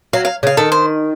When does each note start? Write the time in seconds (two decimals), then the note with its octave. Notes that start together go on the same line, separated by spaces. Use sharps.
0.13 F#3 F5
0.25 F5
0.43 C#3 F5
0.57 D#3 A4
0.72 C5